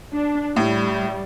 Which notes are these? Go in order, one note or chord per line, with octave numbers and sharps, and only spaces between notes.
D4
A2 G3